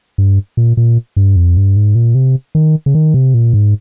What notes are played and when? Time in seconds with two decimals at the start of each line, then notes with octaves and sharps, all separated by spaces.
0.18 G2
0.57 A#2
0.77 A#2
1.17 G2
1.36 F2
1.57 G2
1.76 G#2
1.95 A#2
2.15 C3
2.55 D#3
2.86 C#3
2.95 D#3
3.14 C3
3.34 A#2
3.53 G#2